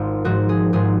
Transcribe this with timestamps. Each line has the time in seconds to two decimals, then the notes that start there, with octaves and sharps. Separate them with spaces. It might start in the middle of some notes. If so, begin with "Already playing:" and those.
Already playing: G#1 F4
0.24 G#1 G#2 F3 F#4
0.49 G#4
0.73 G#1 G#2 F3 G#4